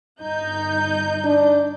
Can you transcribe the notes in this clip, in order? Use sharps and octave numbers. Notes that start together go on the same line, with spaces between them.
G1 D#4 G6
D4